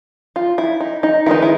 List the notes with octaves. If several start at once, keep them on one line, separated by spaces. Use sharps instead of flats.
F4
E4
D#4
D#4
D#3 G#3 B3 D#4 E4
E4